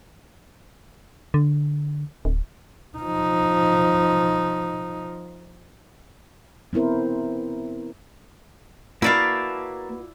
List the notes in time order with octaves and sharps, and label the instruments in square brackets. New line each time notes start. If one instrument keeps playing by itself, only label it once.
[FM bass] D3
D1
[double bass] F3 D#4
[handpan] B3 C4 E4 A#4 C5
[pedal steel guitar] A#3 A5 [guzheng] E4 D5 F5 [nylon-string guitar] F#4 B4